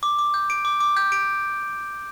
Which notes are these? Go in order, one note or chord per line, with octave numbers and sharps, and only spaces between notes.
D6
D6
G6
D7
D6
D6
G6
D7